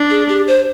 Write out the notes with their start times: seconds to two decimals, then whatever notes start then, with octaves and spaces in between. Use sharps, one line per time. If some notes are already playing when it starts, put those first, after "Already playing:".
Already playing: D4
0.10 G#4
0.28 G4
0.47 C5